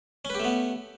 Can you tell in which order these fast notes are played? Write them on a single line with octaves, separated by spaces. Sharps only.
C#4 B4 G4 A3 B3